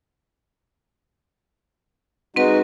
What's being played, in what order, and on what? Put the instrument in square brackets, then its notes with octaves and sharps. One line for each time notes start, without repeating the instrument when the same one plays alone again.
[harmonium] G#3 D#4 F#4 [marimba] C4 B4